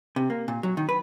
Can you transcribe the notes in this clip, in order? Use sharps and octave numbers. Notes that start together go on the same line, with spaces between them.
C3
A#3
A#2
F#3
D#3
B4